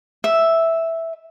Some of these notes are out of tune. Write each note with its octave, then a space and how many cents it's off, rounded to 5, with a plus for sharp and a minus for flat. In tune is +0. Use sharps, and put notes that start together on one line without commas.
E5 -5